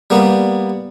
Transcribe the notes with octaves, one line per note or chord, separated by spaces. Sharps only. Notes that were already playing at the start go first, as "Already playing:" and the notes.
G3 A#3 B3